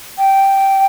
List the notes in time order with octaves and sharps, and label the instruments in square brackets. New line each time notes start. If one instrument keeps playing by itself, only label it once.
[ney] G5